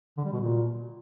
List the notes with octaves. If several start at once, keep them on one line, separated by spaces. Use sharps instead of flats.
D3
G3
B2
A#2